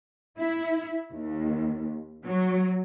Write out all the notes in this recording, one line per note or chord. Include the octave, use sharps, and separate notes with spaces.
E4
D#2
F#3